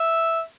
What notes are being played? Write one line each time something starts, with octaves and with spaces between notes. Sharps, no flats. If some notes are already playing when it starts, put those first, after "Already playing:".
Already playing: E5